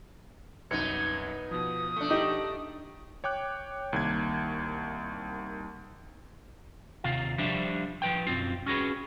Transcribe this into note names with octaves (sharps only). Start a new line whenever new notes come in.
C2 F#2 B3 D#4 G#6 C#7
B2 F3 D#6
A3 D4
D#4 G4
C#5 G5 D6 F#6
C2 D#3 A#3 G#6
D#2 C3 F4 F5
F3 G3 D4 C5 E5
F3 B4 G5
B1 F#2 C4 F4
C#4 F#4 G#4 B4